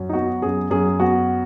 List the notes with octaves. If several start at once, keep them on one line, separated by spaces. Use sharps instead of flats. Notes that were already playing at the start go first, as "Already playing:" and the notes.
Already playing: F#2 F#3
D#4
B3 F#4
F#2 G#4
F#2 G#4
B3 F#4